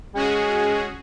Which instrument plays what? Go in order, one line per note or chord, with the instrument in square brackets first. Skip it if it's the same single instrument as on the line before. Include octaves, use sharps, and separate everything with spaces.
[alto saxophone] G#3 [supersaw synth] C#4 F#4 G#4